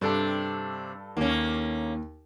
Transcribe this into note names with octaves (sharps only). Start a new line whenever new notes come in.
G2 C3 D4 A4 A5
D#2 A#3 C#4